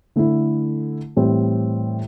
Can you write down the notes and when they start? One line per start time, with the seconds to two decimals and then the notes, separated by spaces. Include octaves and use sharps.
0.16 D3 A3 E4 A4
1.16 A2 E3 G3 C4 E4